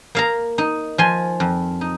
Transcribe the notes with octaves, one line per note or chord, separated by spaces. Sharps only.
A#3 F5 A#5
D#4
F3 G#5 C6
F2
D#4